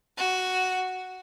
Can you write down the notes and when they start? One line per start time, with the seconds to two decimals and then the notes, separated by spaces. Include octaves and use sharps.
0.18 F#4